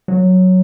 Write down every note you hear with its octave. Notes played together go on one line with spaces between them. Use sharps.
F#3